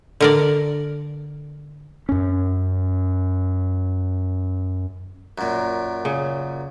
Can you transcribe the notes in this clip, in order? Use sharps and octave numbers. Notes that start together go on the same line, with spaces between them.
D3 A#4 D5
F#2 C#4
F#2 A#2
C#3